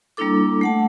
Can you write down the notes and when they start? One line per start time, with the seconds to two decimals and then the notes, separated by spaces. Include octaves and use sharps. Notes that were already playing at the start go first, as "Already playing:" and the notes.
0.17 G3 A#3 D4 E4 A4 D6
0.61 A3 F#5 A5